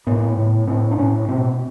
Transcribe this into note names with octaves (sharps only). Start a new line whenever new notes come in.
A2 B3
A2
A2 C4
D4
A2 C#4
B2 C4